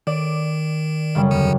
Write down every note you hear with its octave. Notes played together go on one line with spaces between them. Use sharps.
D#3 D5
F#2 C#3 G3
E2 D3